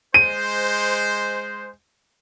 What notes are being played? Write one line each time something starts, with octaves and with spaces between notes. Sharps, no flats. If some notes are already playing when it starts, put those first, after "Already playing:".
G#3 C5 D#7